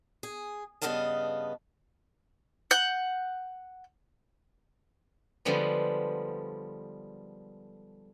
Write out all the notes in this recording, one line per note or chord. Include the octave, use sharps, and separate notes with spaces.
G#4
G2 C#3 B3 D#5 F5 A5
F#5 G6
D3 F3 G3 G#3 B3